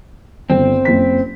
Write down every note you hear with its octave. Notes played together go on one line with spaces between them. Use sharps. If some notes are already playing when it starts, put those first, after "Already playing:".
G1 C4
F#1 B6